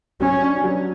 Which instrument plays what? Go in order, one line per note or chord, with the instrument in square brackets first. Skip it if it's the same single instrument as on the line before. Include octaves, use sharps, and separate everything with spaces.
[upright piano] F#3 [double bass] C#4
[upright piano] D4
F#3